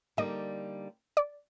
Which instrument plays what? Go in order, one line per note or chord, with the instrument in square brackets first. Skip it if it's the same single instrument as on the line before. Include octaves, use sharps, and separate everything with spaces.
[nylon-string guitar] D3 G3 A#3 D#4 [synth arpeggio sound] D#5
[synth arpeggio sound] D5